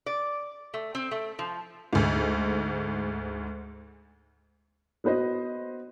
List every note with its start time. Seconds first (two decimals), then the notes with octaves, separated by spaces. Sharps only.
0.06 D5
0.74 A3
0.95 C4
1.11 A3
1.39 F3
1.93 D2 G#2
5.04 B3 F#4 B4 C5 D#5